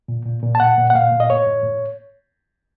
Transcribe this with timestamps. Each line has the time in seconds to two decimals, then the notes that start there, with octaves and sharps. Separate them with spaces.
0.08 A#2
0.25 A#2
0.43 A#2
0.55 A5
0.60 A#2 F#5
0.78 A#2
0.90 F#5
0.95 A#2 F5
1.12 A#2
1.20 D#5
1.30 A2 C#5
1.47 A2
1.63 A2